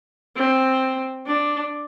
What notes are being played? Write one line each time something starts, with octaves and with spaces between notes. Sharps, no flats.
C4
D4